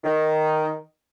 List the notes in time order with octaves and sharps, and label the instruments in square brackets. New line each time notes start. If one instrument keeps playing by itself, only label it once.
[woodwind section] D#3